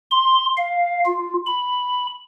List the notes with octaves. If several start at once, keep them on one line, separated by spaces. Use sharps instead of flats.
C6
F5
F4
B5